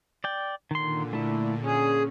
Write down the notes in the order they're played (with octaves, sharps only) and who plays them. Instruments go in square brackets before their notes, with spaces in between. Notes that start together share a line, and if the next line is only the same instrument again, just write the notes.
[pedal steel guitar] D5 G5
[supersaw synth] A#2 D3 [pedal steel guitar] D#3 C6
[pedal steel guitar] A3 E4
[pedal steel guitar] C#4 [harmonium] G#4